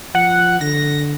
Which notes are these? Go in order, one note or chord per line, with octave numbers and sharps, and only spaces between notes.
F3 F#5
D3 A#6